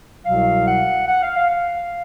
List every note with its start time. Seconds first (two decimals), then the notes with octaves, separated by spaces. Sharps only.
0.25 C2 B2 F#3 F5
0.66 F#5
1.08 F#5
1.23 F5
1.36 F5
1.50 F5